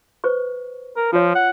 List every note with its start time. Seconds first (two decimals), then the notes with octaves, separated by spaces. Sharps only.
0.24 B4 C5 C#6
0.96 A#4
1.13 F3 F4 C#5
1.35 F#5